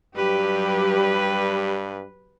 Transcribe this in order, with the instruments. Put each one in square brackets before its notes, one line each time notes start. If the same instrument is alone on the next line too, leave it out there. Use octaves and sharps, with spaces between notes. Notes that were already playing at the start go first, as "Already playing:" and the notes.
[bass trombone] G2 [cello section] F#3 G4 [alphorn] G3 [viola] B4